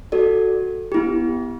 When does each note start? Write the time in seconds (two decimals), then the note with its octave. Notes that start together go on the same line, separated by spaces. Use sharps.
0.12 F#4 A4 D5
0.92 B3 E4 G4